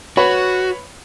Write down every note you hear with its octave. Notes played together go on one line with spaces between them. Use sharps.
F#4 B4 C#5 B5